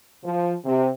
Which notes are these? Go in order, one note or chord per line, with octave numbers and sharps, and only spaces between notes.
F3
C3